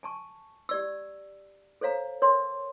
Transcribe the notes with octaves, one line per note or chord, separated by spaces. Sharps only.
G#5 A5 C#6
G4 D5 E6
A4 C5 C#5 F5 A#5
A#4 C#5 C6